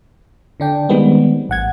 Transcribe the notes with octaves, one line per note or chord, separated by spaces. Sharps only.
D3 D4 G5
D#3 G3 G#3 B3 C4
A1 F#5 G#6